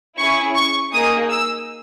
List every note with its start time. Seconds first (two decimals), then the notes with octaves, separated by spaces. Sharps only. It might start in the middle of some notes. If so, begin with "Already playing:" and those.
0.18 C#4 E4 G#4 C#6
0.55 C#6
0.93 A#3 D#4 G#4 D#6
1.30 E6